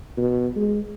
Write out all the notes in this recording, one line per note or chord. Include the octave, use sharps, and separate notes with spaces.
B2
G#3